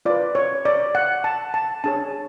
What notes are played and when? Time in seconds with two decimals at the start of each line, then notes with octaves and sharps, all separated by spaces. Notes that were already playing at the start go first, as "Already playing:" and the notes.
0.05 F4 B4 D5
0.35 C#5
0.65 D5
0.95 F#5
1.24 A5
1.54 A5
1.84 D4 G#4 C#5 A5